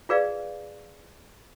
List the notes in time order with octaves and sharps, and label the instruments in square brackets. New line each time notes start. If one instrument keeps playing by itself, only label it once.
[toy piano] F4 G#4 B4 D5 F5